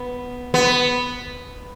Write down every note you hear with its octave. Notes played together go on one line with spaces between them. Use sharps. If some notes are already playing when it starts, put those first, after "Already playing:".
Already playing: B3
B3